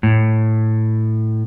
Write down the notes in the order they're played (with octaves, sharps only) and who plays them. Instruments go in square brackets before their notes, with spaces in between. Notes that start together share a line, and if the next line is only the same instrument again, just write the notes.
[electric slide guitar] A2